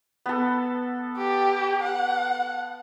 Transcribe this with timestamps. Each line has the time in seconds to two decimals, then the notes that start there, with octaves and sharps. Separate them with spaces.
0.26 B3 A4
1.17 G4
1.82 F#5